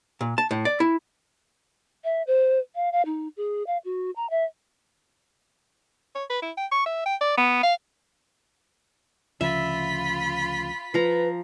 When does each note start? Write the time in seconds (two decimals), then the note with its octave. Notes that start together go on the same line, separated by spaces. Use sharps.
0.21 A#2
0.38 A5
0.51 A2
0.65 D5
0.80 E4
2.04 E5
2.27 C5
2.75 F5
2.92 F5
3.06 D#4
3.37 G#4
3.67 F5
3.85 F#4
4.16 A#5
4.30 E5
6.15 C#5
6.30 B4
6.42 E4
6.57 G5
6.72 C#6
6.86 E5
7.06 G5
7.21 D5
7.38 B3
7.63 F5
9.41 D2 C#3 F3 F4 E5 B5
10.94 F3 B4 A#5